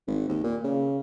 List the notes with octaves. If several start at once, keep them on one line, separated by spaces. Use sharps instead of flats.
G#1
D#2
A#2
C#3